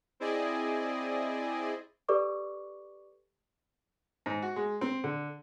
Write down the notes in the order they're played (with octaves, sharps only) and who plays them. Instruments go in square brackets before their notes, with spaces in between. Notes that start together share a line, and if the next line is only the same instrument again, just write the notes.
[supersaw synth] C4 E4 G#4 D5 D#5 G#5
[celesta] G4 A4 B4 D5 C#6 D6
[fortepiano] G#2
F#4
G#3
C4
D3